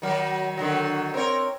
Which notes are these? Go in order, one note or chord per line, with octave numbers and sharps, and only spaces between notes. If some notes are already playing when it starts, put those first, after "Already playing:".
D#3 F#3
D3 D#3 F#3
C4 A#4 C#5